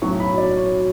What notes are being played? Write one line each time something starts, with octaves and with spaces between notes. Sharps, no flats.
B1 A2 F#3 C#6
B5
D5
C#5